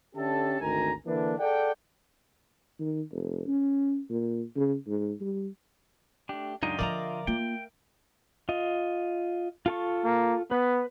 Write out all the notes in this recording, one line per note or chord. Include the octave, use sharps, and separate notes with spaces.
D3 C#4 G4 A4 E5 A5
G#1 D2 D#3 G#5 A#5
D3 E3 A#3 D4
G#4 A4 D5 F#5 G5
D#3
F1
C#4
A#2
C#3
G#2
G3
A3 D4 G4
C#2 F#2 D4 D#4 F4 D#5 G5
D3 F3 A#4 D5 E5 F5 A#5
A#3 F4 G5
F4 D#5
F4 A4 C#6
A#3
B3 B4